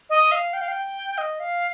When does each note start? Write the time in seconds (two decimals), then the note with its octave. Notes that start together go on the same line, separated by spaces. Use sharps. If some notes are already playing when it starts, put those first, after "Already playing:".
0.09 D#5
0.31 F5
0.53 G5
0.61 F5
0.68 G5
1.18 D#5
1.40 F5